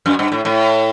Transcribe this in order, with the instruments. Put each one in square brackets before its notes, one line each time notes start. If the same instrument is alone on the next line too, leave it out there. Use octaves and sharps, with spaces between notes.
[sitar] F#2
G2
A2
A2